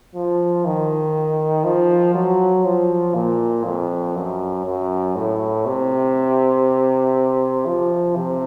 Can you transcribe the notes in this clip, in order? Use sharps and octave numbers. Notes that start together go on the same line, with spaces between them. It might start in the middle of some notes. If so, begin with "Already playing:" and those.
F3
D#3
F3
F#3
F3
A#2
F2
F#2
F#2
A2
C3
F3
C3